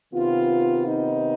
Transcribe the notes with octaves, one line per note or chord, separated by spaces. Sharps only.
C3 D#3 B3 F4
D#4